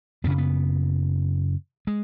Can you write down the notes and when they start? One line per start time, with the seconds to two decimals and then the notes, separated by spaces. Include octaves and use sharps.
0.24 F#2 B3
0.27 C#3 C#4
0.38 B3
1.87 G#3